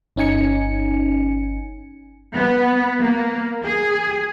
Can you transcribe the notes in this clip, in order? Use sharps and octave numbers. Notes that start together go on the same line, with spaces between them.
G1 C#4 D#4 G#5 C#7
B3
A#3
G#4